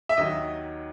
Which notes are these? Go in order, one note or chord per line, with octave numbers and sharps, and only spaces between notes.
E5
D#2 D#3 F#3 D#5